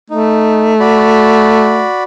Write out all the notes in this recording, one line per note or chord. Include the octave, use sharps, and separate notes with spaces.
A3 D#4
F#4 D5 B5